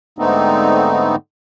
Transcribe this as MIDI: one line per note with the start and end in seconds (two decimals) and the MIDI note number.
0.19 1.16 44
0.19 1.16 50
0.19 1.16 57
0.19 1.16 59
0.19 1.16 60
0.19 1.16 63